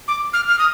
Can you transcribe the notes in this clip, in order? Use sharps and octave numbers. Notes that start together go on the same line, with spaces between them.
D6
F6
F6
D#6